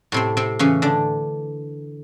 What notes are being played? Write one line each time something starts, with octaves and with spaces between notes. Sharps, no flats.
A2 C3 C4
C3 C4
C#3 E3 C#4
D3 D4